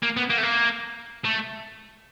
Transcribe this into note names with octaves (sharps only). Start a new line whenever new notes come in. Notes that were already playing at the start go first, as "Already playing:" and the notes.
A#3
B3
A#3
A3
A#3
A3